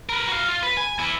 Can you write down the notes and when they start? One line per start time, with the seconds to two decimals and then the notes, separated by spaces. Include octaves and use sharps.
0.09 A#4 B4
0.28 F#4 F5
0.49 F4
0.63 B4
0.77 G#5
0.99 B3 E4